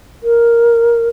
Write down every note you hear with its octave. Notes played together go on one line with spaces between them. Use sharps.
A#4